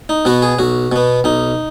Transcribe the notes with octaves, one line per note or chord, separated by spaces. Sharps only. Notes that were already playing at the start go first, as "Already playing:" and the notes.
D#4
B2 B3 F#4
G#4
B1 F#4
B2 B3
B1 D#4